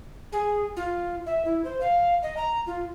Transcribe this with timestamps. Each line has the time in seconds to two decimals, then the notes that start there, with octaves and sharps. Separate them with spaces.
0.32 G#4
0.76 F4
1.26 E5
1.45 E4
1.65 C5
1.81 F5
2.23 D#5
2.37 A#5
2.67 F4